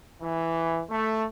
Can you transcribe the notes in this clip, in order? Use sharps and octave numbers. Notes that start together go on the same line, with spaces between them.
E3
A3